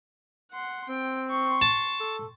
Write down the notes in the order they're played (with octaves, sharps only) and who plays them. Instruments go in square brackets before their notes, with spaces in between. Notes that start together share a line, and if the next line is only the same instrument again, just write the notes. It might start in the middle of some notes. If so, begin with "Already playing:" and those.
[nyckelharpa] F#5 C6
[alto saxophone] C4 [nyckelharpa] G5
[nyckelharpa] C6 C#6
[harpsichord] A5
[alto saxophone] A4